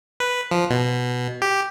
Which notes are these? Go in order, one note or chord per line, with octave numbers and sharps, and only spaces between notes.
B4
F3
B2
G4